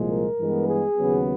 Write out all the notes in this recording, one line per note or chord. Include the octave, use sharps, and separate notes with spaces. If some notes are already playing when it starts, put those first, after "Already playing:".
Already playing: C2 A#2 F3 G#3
A#4
G2 E3 G#3 B3
G#4
D#2 C#3 F#3 B3